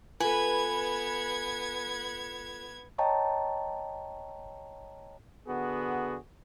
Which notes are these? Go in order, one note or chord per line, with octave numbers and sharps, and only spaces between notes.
B3 F4 A4 B4 G#5 G#6
C#5 D#5 G5 A5 A#5 C#6
D3 B3 F#4 G#4